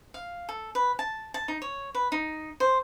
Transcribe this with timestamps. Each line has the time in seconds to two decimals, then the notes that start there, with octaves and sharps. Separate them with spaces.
0.14 F5
0.49 A4
0.75 B4
0.99 A5
1.34 A5
1.48 D#4
1.62 C#5
1.95 B4
2.12 D#4
2.60 C5